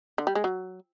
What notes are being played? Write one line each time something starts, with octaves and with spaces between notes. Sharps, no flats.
D3
G3
G#3
F#3